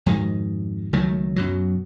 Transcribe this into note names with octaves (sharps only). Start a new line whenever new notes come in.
F2 G#2 B2 D#3
C#2 D#3 F#3 A3
F#2 B2 F#3